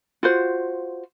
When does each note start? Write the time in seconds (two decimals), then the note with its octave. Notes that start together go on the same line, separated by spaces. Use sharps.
0.23 F4 F#4 C5